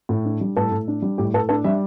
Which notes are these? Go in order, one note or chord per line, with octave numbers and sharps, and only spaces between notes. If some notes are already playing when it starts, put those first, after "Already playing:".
A2
D4
G3
A2 A4
A2
D4
G3
A2 G4
A2 A4
D4 A4
G3 E5